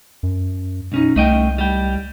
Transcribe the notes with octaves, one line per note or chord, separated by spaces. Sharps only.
F#2
B1 C#4 D#4
C2 A3 D#5 G5
G3 G5